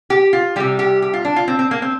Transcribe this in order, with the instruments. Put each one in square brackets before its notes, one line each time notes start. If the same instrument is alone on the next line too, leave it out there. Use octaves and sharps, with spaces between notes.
[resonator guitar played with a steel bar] G4
F4
C3 G3 G4
G4
G4
F4
D4
F4
C4
C4
A#3
C4